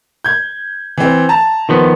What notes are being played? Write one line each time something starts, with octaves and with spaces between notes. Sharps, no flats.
G6 G#6
E3 C4
A5 A#5
D#3 F3 B3